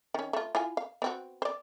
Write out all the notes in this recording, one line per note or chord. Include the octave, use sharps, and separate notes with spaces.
D#3 C#4
A3 F4
E4 F4 G#5
F5
B3 C4 F#4
C5 D5